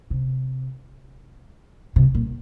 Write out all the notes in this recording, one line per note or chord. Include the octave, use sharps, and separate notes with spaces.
C3
C3
A#2